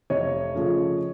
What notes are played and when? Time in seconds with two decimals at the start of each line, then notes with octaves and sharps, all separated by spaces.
0.10 F1 C#5 D#5
0.55 C#3 F3 A3